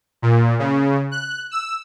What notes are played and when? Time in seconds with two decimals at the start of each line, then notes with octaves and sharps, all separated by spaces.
0.22 A#2
0.59 C#3
1.11 F#6
1.51 E6